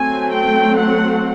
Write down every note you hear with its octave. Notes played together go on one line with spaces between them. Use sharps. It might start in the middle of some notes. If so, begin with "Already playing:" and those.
Already playing: F#3 A3 C4 G#5
G5
F#5